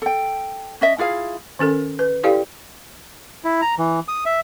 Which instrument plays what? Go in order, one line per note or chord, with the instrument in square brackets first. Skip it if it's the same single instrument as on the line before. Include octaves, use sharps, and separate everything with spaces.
[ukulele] A4 G5
C#4 D#5 E5
E4 F4 G#4 F5
[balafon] D#3 C#4 A4 A#4
B4
E4 G4 A4 D5 F5 G5
[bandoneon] E4
A#5
E3
D#6
E5